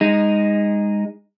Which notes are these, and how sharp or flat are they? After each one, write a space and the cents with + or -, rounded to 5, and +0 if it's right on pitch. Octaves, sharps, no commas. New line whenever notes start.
G#3 -25 D#4 +0